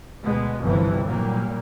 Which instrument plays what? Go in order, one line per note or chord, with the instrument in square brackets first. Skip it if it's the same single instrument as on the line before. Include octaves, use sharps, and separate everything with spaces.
[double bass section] D2 B2 G#3 B3
G1 C2 C3 E3 F3
A#2 F#3 G3 A#3